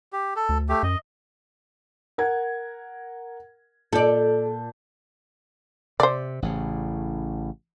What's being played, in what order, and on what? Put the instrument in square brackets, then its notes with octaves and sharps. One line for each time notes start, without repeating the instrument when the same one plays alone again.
[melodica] G4
A4
[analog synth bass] D2
[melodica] A3 G4
[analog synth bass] F#2 [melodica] D#5
[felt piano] A#4 F#5 G#6
[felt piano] A#2 A5 G6 [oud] A4 D5
[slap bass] C3 [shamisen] C5 D5
[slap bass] A1 A2 C#3